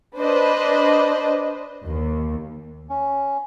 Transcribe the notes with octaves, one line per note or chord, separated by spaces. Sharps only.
D4 B4 C5 D#5
D#2
C#4